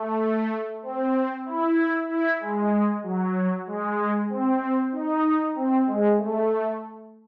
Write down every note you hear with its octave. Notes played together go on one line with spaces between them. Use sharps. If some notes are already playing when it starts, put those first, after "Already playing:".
Already playing: A3
C4
E4
E4
G#3
F#3
G#3
C4
D#4
C4
G#3
A3